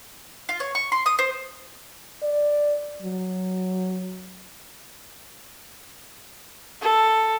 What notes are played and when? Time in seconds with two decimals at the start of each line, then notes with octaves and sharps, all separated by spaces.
0.49 F4
0.60 C#5
0.75 C#6
0.92 C6
1.06 D#6
1.19 C5
2.23 D5
3.02 F#3
6.82 A4